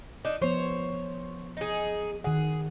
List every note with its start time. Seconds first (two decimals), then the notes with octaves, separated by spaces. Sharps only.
0.25 D4 D#4
0.41 F3 B3 C5 C#5
1.57 D#4 G#4
2.24 D#3 G#4 F#5